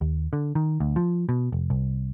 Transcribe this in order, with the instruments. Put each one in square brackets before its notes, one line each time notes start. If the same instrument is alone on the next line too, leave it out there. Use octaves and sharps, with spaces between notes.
[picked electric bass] D#2
D3
D#3
D2
F3
B2
F1
C2